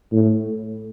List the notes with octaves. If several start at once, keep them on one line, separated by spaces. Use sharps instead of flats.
A2